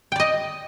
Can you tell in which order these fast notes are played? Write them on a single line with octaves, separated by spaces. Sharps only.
G5 D5 D#5